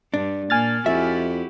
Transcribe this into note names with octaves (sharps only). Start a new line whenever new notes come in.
G2 D4
A#2 A#3 G#5 F6 A6
F2 E4 F#4 G4 E5